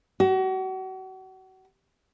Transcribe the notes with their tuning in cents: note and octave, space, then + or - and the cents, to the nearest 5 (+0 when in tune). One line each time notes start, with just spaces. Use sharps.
F#4 +35